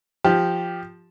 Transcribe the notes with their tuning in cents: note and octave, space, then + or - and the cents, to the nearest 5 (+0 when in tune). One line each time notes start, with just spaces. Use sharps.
F3 +0 G4 +0